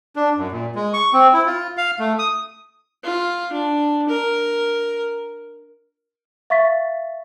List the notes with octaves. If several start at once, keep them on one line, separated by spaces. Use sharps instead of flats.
D4
F#2
A#2
G#3
C#6
C4
E4
F4
F5
A3
D#6
F4
D4
A#4
E5 F5 C#6 A6 B6